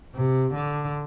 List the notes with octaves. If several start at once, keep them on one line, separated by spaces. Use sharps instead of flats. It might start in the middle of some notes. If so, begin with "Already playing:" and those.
C3
D3